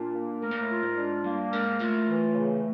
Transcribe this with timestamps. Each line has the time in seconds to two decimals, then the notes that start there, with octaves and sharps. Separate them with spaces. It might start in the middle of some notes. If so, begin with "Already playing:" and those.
Already playing: A#2 D4 F4
0.15 A#3
0.42 A2 A#4
0.51 A#2
0.61 A2
0.69 F4
0.83 G#2
0.97 D4
1.24 G2 A#3
1.52 G#2 A#4
1.80 A2 F4
2.07 E3
2.34 C#3